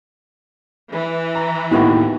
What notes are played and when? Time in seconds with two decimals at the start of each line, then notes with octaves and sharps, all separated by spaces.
0.90 E3
1.35 A#5
1.71 D#2 A2 B3 D#4 F#4